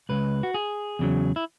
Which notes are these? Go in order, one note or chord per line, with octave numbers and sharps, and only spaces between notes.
C#2 C#3 G#3 B4
F#4
G#4
E2 C#3 F#3
E4